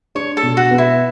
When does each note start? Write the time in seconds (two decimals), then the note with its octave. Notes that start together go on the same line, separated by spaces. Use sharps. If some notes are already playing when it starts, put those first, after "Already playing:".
0.15 D4 C#5
0.37 A4
0.43 B2
0.57 F#4
0.71 B3
0.78 E4